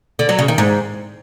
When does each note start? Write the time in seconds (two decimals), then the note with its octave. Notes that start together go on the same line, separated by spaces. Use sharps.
0.19 D3
0.29 F#3
0.39 C#3
0.48 D#3
0.58 G#2